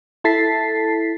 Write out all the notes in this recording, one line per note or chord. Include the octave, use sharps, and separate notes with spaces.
E4 A4 A5 A6 B6 C7